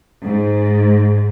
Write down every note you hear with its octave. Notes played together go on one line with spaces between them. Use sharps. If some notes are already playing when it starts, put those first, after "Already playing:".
G#2